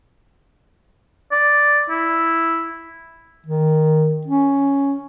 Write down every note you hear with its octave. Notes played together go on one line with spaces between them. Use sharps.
D5
E4
D#3
C#4